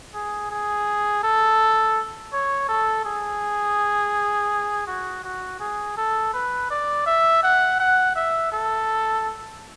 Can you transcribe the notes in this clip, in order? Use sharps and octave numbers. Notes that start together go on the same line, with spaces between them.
G#4
G#4
A4
C#5
A4
G#4
F#4
F#4
G#4
A4
B4
D5
E5
F#5
F#5
E5
A4